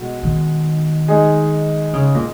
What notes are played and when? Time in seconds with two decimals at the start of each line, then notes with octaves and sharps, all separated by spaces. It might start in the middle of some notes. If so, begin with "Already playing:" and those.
Already playing: B2 G#3 F#4
0.23 D#3
1.08 G#3 D#4 G#4
1.93 C#3
2.15 A#2